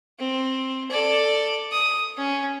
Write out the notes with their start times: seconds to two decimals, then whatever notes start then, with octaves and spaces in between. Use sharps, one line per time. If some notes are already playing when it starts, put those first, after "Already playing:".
0.19 C4
0.90 A4 D5
1.71 D#6
2.17 C#4